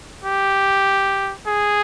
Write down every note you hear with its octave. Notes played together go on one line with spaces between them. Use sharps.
G4
G#4